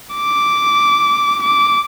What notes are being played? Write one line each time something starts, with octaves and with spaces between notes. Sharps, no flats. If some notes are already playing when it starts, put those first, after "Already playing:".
D6
D6